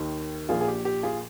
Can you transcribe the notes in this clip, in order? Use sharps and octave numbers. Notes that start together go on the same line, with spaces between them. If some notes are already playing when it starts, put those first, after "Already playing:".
Already playing: D#2 D#3
A#1 A#2 F4 G#4
G#4
G4
G4
F4 G#4